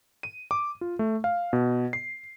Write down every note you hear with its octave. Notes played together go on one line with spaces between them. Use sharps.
D#7
D6
F4
A3
F5
B2
C7